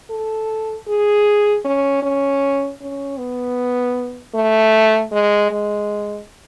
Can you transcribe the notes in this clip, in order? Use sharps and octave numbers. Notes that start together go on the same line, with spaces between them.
A4
G#4
C#4
C#4
C#4
B3
A3
G#3
G#3